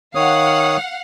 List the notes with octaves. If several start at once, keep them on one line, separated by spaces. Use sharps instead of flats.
D#3 C#5 F5 F#5 D#6